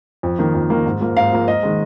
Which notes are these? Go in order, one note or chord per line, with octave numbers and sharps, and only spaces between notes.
F2
D#3 A#3
F2
D#3 A#3
G#2
F3 A#3
G#2 F5
F3 A#3
G#2 D#5
D#3 G#3